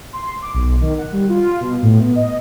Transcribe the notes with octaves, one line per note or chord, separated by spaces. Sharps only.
C6
D6
B1
D#3
F#5
G3
F4
B2
A2
B3
D#5